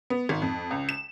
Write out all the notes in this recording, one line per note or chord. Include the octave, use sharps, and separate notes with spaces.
B3
G#1
F2
C#2
E7